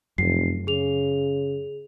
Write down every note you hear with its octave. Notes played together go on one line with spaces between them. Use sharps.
F1 F#2 C7
C#3 G#4 F7